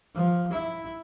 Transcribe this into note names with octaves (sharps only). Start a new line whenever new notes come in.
F3
E4